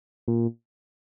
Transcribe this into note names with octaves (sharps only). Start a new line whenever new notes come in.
A#2